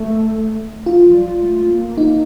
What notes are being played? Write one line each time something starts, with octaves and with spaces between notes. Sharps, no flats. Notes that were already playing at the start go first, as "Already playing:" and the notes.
Already playing: A3
F4
F3
G3
G3
A3
C4
A#3
D#4